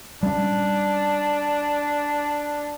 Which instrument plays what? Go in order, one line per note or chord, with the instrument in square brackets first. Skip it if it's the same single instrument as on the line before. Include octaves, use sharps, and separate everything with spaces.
[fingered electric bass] G3 C#4 [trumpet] D4